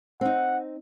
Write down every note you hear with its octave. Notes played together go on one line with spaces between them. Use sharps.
C4 D#4 F#5